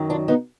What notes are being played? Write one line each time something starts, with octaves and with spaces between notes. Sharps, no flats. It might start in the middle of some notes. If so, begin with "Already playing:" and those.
Already playing: F#2 D#3 F#3
D4 F4
B3 D#4